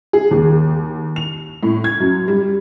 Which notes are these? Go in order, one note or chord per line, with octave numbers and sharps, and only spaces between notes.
G#4
D#2
F7
A2
G#6
F#2
G3